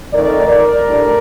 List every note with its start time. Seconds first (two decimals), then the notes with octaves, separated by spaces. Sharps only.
0.13 F2 D#3 A3 D#4 A#4 D5
0.47 A#4 D5
0.83 A2 G3 D4